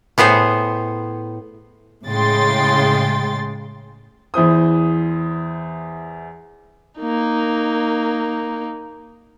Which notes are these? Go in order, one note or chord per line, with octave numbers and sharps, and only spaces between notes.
A2 B3 G#4 C5
A2 C#3 G#3 G5 C6 A6
E2 E4 C5 D#6
A#3 D#4